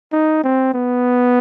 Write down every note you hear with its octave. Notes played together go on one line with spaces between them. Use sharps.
D#4
C4
B3